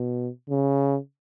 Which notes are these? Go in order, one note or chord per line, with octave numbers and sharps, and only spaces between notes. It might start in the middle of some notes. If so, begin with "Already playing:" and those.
Already playing: B2
C#3